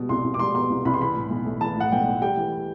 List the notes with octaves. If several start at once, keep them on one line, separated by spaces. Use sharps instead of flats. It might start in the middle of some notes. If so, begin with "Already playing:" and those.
Already playing: B2 G3
C2 C6
C2
D6
G3 C6
B2 C6
C2
C2 B5
C6
E3 B5
A2
B1
A3
E3 A5
A2 F#5
B1 G5
A3
G3 G5
E3